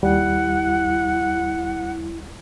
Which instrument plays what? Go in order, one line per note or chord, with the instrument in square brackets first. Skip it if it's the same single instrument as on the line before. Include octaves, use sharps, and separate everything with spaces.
[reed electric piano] D#2 G3 [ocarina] E4 [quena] F#5